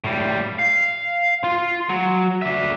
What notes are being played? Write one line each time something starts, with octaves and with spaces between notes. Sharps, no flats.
A2 G3
F5
F4
F#3
D4 E5